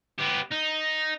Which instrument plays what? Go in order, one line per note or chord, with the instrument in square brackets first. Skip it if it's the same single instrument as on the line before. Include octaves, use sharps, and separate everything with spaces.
[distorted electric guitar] B3 G4
D#4